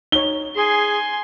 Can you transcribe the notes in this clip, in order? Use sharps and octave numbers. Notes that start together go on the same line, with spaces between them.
D#4 C#5 G7
G#4 G#5 C6